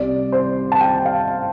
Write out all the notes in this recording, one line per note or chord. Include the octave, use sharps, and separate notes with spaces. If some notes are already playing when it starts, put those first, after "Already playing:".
Already playing: C2 C3 G3 D5
C5
A5
G5
F5